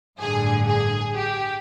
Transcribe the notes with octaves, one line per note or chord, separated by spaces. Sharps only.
A1 G2 D3 G#4
G#4
G4